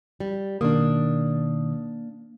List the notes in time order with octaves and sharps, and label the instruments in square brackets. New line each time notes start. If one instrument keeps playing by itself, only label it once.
[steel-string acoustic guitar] G3
[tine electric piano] B2 D#3 D#6 [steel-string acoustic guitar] A#3 D4